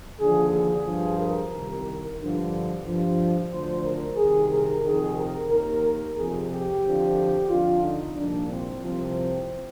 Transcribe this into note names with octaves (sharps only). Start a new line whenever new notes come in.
D#2 D3 F3 G#4
G#4
G2 F3
A#4
C2 C3 D#3
G2 D3 F3
G2 F3
D2 D3 F3 C5
A#4
C2 C3 D#3 G#4
A#4
F2 C3 D#3 G#4
A#4
D#2 D#3 A#4
A#4
F2 C3 F3 G#4
G4
F2 D3 F3
F2 D3 F3 F4
D#4
C2 A#2 F3 D4
C4
C2 C3 F3 C4